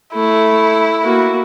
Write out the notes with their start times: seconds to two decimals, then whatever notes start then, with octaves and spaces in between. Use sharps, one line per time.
0.14 A3 E4
1.02 A#3 F#4